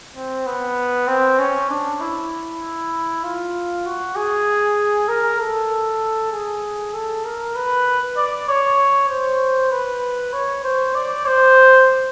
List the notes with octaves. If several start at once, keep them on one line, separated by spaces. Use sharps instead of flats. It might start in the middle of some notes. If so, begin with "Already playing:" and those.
C4
B3
C4
C#4
D4
E4
F4
F#4
G#4
A#4
A4
G#4
A4
A#4
B4
D5
C#5
C5
B4
C#5
C5
D5
C5